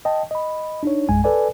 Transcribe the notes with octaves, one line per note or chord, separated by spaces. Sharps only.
D#5 G5 A5
D#5 B5
D4 D#4 C#5
A#1 F#2 G#3 G#5
A4 B4 D5 G#5